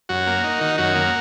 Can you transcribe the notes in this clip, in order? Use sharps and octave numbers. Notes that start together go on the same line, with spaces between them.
F#2 F#4
A#3
D#4
D#3
F#2 F#4
A#3